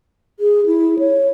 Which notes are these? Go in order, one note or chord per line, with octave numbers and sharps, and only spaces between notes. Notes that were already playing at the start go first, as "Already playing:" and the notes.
G#4
E4
C#5